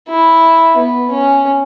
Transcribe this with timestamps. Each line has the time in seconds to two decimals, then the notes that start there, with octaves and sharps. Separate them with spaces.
0.09 E4
0.77 B3
1.11 C#4